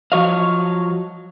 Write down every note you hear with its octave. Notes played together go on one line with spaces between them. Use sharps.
F3 F#3 F#4 C#5 D#5 F5